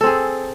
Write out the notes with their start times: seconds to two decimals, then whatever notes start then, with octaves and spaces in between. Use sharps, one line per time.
0.01 A4
0.03 C4
0.06 G#4